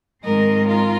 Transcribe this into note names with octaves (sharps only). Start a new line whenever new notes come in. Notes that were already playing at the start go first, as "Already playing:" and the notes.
G#2 D#3 G#3 C4 A#4 D#5
F4 A#4